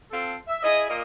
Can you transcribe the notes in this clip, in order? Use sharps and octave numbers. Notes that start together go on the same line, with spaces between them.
C4 F4 A4
E5
E4 G#4 D#5
A#2 A#3 D#5